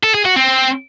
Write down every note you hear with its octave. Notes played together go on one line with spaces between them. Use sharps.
A4
G#4
F#4
C4